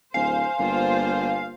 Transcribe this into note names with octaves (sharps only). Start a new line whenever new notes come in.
D1 C5 F5 G#5
G1 A#3 F4 C5